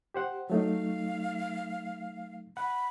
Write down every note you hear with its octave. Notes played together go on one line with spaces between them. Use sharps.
G4 C5 F#5
F#3 A3 D#4 F5
F#5 B5